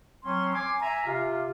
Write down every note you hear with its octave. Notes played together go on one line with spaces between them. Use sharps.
F#3 C4 C#4 C6
G#5 C6 D6
E5 G#5 A#5
C3 F4